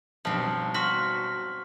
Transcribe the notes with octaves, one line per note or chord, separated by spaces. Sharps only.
B1 G2 F3 C4
F#4 C6 F6 B6